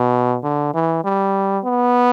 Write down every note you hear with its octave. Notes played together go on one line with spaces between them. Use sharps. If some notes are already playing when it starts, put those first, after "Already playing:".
Already playing: B2
D3
E3
G3
B3